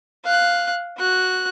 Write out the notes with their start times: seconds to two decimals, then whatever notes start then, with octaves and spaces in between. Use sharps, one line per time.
0.24 F5 F#6
0.97 F#4 F#6